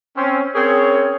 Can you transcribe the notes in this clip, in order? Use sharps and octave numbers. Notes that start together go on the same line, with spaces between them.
C4 C#4
C4 C#4 G#4 A#4 C#5